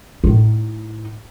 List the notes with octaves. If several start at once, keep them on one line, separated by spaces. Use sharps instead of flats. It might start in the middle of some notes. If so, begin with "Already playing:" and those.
A2 D#4